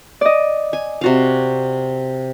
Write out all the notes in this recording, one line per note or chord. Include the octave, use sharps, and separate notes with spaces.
D5 D#5
G#5
C3 F#4 F5